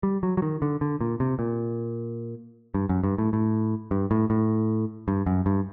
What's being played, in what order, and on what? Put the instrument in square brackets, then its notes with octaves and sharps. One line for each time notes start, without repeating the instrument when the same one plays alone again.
[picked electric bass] G3
F#3
F#3
D#3
D3
D3
A#2
C3
A#2
G2
F#2
G2
A2
A2
G2
A2
A2
G2
F#2
G2